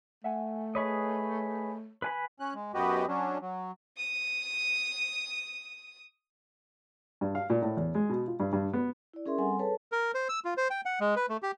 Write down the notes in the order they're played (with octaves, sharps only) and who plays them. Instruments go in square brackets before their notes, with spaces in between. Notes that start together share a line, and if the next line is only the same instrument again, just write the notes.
[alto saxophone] A3 [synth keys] E5 F#5 G#5
[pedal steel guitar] G#4 B4 D#5 [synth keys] C#5 C#6
[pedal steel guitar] B4 G#5 B5
[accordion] C#4 F#6
G#3
F#2 B3 F#4 G4 B4 D#5
F#3 C#4 D4
F#3
[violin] D#6 D#7
[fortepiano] G2
F5
A#2
A2
E2
G#3
B2
F4
G2
G2
B3
[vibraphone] E4 D5
C#4 G#4 A#4 E5 C6
G3 C4 A4 F#5 G#5 C6
G#4 A4 B4 C#5 A5
[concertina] A#4
C5
E6
F4
C5
G5
F#5
G#3
B4
A3
G4